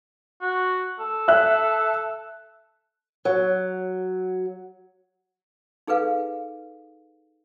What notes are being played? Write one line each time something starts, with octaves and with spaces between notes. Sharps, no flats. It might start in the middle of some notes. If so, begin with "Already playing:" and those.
F#4
A4
E5 F#6
F#3
D#4 G#4 A4 B4 F5